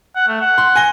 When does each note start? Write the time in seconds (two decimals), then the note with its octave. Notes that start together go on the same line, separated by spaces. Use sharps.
0.16 F#5
0.28 A3
0.41 F#5
0.58 C6
0.76 G#5 A#6 G7